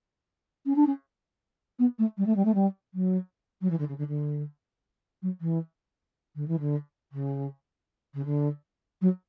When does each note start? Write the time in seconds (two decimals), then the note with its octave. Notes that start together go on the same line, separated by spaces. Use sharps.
0.66 C#4
0.76 D4
0.87 C#4
1.79 B3
1.99 A3
2.18 G3
2.26 A3
2.36 G3
2.45 A3
2.54 G3
2.94 F#3
3.61 F#3
3.70 E3
3.79 D3
3.89 C#3
3.98 D3
4.08 D3
5.22 F#3
5.41 E3
6.35 D3
6.48 E3
6.59 D3
7.12 C#3
8.14 C#3
8.25 D3
9.01 F#3